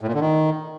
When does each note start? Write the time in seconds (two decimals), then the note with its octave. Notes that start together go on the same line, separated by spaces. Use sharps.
0.01 A2
0.08 A#2
0.14 D3
0.21 D#3